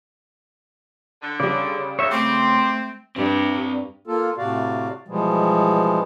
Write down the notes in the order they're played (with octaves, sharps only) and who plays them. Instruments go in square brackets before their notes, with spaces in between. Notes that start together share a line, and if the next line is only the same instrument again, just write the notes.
[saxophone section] D3
[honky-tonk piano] C#3 G3 [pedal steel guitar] D5
[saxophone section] D#2 [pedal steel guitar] C#5 E5
[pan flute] A3 [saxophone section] C4 [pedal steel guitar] D6
[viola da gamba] G2 [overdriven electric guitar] C4 D5
[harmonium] A#3 F4 A4
A2 C3 F#4 D5 F5
B2 E3 F3 G3 G#3